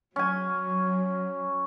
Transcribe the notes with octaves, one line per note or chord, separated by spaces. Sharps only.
F#3 C#4 G#5